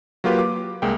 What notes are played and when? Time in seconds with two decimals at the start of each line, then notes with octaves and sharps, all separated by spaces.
0.24 F#3 A#3 F4 G4 B4
0.39 D6
0.82 C2 G#3 A#3 G5